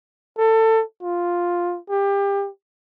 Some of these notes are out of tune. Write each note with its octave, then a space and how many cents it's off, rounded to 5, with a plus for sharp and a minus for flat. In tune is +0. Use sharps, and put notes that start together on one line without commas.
A4 +20
F4 +5
G4 +25